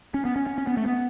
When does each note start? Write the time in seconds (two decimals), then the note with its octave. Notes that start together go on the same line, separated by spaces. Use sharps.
0.14 C#4
0.25 B3
0.36 C#4
0.46 C#4
0.58 C#4
0.67 B3
0.77 A3
0.86 B3